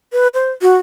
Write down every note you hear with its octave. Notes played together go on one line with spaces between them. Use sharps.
B4
C5
F#4